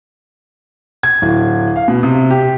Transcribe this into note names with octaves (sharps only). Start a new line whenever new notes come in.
G#6
D1
F5
B2
C3
G4